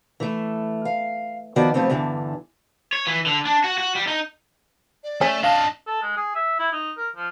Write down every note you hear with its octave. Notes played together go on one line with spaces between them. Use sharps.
E3 A3
F5
D#3 F3 B3 F#4 B4 D5
F3 G3 A3 B3 C4
E2 G2 D3 E3
C#5
E3
D3
D4
F#4
F#4
G3
D#4
D5
A3 C#4
D4 D#5 F5 A5
A4
G#3
G#4
E5
E4
D#4
A#4
F3